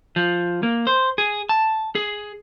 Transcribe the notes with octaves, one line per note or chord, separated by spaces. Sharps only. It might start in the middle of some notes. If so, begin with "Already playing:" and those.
F3
A#3
C5
G#4
A5
G#4